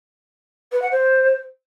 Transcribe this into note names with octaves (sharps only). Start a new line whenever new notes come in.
B4
F#5
C5